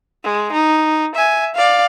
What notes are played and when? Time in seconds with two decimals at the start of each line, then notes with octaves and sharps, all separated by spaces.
0.24 G#3
0.52 D#4
1.15 E5 G#5
1.55 D5 F5